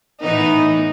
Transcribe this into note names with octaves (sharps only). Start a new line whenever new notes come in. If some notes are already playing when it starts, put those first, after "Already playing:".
A2 E3 B3 D#4